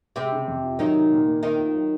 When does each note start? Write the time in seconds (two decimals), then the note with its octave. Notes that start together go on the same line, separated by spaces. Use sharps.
0.16 C3 G#3 C4
0.32 C#3
0.48 F2
0.63 F4
0.79 D#3 F#3 D#4
0.95 C3
1.12 A#2
1.27 A#3
1.43 D#3 C4 D#4
1.58 F4
1.74 F#3